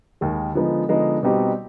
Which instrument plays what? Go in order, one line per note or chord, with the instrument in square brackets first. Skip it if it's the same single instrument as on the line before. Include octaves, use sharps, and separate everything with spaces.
[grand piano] D#2 D#3 G#3
D3 F3 G#3 B3 D#4
D3 F3 G#3 B3 D#4
B2 G3 C4 D#4 G4